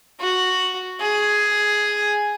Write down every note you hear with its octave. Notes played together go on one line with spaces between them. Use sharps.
F#4
G#4